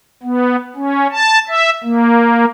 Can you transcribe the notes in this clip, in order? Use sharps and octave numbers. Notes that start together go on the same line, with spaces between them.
B3
C#4
A5
E5
A#3